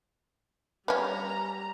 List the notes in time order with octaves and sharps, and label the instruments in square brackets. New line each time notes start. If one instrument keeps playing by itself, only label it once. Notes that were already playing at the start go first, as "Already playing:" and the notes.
[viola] G3 A#5 [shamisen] B3 C#4